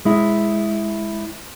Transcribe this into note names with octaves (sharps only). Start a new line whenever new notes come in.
G#3 E4